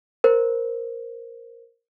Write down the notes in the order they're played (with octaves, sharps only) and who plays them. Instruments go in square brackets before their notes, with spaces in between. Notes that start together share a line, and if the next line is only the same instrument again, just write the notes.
[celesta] A#4 C5